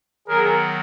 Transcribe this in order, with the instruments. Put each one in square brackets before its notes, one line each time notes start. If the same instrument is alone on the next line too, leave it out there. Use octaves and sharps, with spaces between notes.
[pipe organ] D#3 F#3 B3 [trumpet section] G#4 A#4